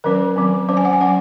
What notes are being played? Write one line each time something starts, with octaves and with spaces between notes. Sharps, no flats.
D#3 F#3 C#4 A#4
D#3 F#3 C4
F#3 C#4 C5
G#5
F#5
G#5
F#3 C#4 F#5